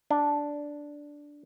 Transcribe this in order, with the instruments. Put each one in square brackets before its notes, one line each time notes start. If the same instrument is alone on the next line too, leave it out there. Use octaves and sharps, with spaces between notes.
[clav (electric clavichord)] D4